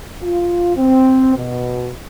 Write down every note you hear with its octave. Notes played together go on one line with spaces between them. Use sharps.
F4
C4
B2